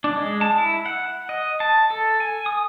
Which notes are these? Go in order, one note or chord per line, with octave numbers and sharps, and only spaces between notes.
D4
G#3
A5
E4
F#5
D#5
A5
A4
G#5
D#6